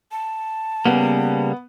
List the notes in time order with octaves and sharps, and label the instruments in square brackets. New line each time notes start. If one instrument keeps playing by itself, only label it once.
[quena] A5
[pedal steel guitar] C#3 G3 A#3 [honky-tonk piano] B3